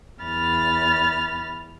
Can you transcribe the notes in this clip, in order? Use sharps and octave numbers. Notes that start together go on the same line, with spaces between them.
E2 B5 F6 A6